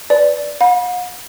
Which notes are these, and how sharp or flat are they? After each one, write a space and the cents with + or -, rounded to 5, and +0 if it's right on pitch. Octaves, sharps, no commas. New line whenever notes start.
B4 +15 D5 +0
F#5 -45 B5 -30